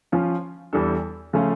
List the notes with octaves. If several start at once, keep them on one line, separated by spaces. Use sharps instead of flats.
F3 C#4 F4
E2 E3 G3 D4 A4
C#3 F3 A3 C#4 F4